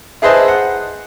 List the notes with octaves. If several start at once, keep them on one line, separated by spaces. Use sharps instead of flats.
E4 G#4 B4 C5 D#5 A5
F#5